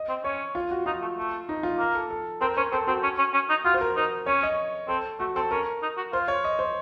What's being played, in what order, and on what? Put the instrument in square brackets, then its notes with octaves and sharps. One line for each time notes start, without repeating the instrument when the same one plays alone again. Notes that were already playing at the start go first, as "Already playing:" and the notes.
Already playing: [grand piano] D#5
[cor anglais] C4
[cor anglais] C#4 [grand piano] C#5
[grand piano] F4
F#4
[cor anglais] D#4 [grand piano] F4
[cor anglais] A3
A3
[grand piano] D#4
F4
[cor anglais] A#3
[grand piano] A4
A4
[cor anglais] C4 [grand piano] A#4
[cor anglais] C#4 [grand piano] C5
[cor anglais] C4 [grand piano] A4
[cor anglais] C4 [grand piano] F#4
[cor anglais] C#4
C#4
C#4
D#4
[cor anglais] F4 [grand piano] F#4
[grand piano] C5
A#4
[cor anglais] D#4 [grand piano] C5
[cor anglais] C#4 [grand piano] C#5
[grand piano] D#5
[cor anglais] C4 [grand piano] A4
[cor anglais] A3 [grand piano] F#4
[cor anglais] C4 [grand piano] A4
[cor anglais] C#4 [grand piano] A#4
[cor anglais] D#4
F#4
[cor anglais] F4 [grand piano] C5
[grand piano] C#5
D#5
C5